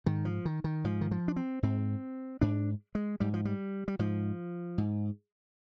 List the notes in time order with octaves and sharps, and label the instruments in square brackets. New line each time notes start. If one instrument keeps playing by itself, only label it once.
[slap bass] G#2 D#3
F3
D#3
D#3
G#2 F3
D#3
F3
D4
C4
G#2 C4
G#2 D4
G#3
G#2 G3
F3
G3
G3
G#2 F3
G#2